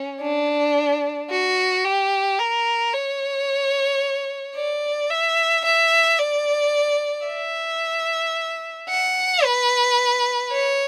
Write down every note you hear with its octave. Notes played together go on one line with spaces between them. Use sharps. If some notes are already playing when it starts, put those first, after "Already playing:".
Already playing: C#4
D4
F#4
G4
A#4
C#5
D5
E5
E5
D5
E5
F#5
B4
C#5